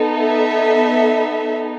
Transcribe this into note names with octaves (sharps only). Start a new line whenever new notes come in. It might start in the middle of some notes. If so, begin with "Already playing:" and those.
Already playing: B3 D#4 A4
E5